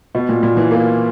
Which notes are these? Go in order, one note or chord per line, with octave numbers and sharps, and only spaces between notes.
B2
A#2
A#2
E3
A#3